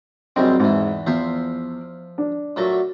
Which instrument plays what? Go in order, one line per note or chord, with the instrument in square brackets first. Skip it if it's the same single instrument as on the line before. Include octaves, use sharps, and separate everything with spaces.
[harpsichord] F#2 C3 G#3 [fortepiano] G3 C4
[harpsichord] E2 E3 [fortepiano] G#2
[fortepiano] E2 [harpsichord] F3 C5 E5
[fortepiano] D4
[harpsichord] A#2 F#3 A3